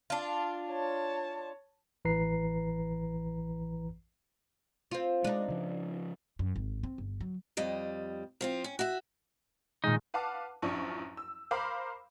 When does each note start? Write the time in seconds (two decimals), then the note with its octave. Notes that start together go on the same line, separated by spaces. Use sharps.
0.10 D4 F4
0.70 C#5 A5
2.05 A1 E3 B4 A#5 C7
4.91 C4 F4
5.24 G#3 D4 D#4
5.48 C#3 F3
6.39 F#2
6.56 G#1
6.83 C4
6.98 G1
7.21 F#3
7.57 F2 G3 D#5
8.41 F3 C4 F4
8.64 C#4
8.79 F#4 E5
9.84 A#2 D#3 G#3 D#4
10.14 B4 F5 F#5 A5 D6
10.62 A1 F#2 F3 D4 C#6
11.17 E6
11.51 A#4 C5 F5 B5 D6